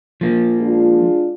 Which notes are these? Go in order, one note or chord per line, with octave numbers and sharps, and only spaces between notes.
F3 A#3
G#3 D4 F4